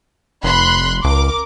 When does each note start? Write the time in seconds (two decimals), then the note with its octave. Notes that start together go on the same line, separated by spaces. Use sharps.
0.43 F1 B5 C6 F#6
1.04 C#2 A#4 D6